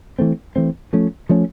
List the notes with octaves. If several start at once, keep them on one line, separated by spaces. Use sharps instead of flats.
E3 A3 C4
E3 A3 C4
F3 A3 C#4
F3 A3 C#4